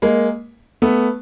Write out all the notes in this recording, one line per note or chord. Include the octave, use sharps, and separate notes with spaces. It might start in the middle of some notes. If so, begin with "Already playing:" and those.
G#3 A#3
A3 B3